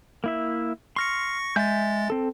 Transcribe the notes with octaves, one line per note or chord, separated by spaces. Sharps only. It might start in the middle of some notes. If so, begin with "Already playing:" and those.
A#3 E4 E5
C6 C#6 F6 A#6 C#7
G#3 E5 G#5 G6 A6
C4 A4